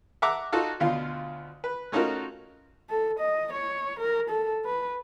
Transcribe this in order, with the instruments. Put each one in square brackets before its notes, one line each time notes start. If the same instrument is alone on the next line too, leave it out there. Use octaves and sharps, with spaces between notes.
[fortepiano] E5 F#5 A#5 D6
D#4 F4 F#4 A4
D2 B2 F4 F5
B4
A3 C#4 D#4 F4 F#4 A#4
[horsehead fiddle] A4
D#5
C#5
A#4
A4
B4